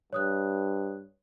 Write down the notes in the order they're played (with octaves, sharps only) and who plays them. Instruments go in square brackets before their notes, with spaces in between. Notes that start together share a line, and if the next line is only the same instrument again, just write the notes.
[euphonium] G2 [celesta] C#5 D#6 F#6